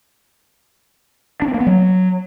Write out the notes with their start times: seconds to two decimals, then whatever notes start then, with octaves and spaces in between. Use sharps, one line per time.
1.42 D4
1.48 C4
1.54 A#3
1.60 B3
1.67 F#3